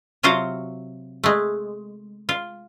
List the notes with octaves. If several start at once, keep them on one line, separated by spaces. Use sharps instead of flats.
C3 F#3 F4 F#4 C5 F5
G#3 A3
F4